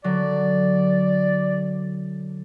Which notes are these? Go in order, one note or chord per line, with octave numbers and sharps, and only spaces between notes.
D3 F#3 D5